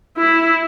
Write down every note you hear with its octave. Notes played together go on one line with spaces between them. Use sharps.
E4